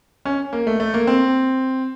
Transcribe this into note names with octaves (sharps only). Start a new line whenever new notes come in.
C#4
A#3
A3
A3
A#3
C4